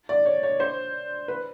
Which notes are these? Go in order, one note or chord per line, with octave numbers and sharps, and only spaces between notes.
D5
C#5
C#5
C5
B4